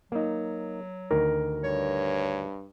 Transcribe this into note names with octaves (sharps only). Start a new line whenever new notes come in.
F#3 A#3 D#4
D2 D#3 A#4 A#5
G2 C#5